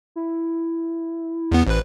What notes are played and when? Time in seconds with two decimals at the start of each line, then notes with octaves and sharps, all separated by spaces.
0.16 E4
1.52 E2 B3
1.67 A1 B4 C5